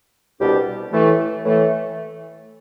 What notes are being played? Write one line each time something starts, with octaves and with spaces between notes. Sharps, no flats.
C2 B2 G3 D4 G4
A2 E3 A3
A2 E3 A3